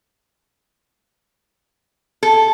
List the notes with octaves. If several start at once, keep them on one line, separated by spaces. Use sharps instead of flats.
A4